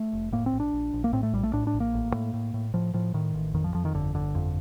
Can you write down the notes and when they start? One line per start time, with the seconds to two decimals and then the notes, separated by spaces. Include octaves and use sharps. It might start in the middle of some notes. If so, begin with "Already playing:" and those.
Already playing: A3
0.13 F1
0.32 A2 A#3
0.46 C4
0.53 A#1
0.60 D4
0.73 A#1
0.93 A#1
1.04 A#3
1.13 A2 C4
1.23 A3
1.33 A#1 G3
1.43 A3
1.53 A2 D4
1.67 D4
1.74 A#1
1.80 A#3
1.94 A1
2.14 A2
2.34 A2
2.54 A2
2.74 A2 F3
2.94 A2 F3
3.14 A2 D#3
3.34 A1
3.54 F2 D#3
3.64 F3
3.74 F2 F3
3.85 D#3
3.94 G1 D3
4.15 G1 D3
4.35 F2